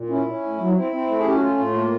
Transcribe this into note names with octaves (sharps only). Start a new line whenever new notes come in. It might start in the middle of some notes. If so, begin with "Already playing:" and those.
Already playing: A#2
C#4 E4
C#4
A2
F#3
C4 E4
C4
A3
G#4
C#4 G4
F#4
A3 F4
A2
A#3